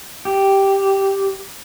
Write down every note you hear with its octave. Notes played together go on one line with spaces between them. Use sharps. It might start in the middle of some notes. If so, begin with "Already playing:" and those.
G4